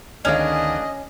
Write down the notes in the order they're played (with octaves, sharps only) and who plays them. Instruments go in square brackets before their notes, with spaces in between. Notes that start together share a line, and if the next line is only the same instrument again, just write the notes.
[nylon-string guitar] D2 D#3 F5 [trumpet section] B3 D4 G#4 [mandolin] C#4 [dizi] D#5